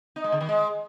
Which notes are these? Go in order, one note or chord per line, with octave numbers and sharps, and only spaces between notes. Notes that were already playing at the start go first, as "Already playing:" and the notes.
D#4
G#3
D3
D#3
G#3